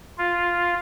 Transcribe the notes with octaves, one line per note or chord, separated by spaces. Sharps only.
F4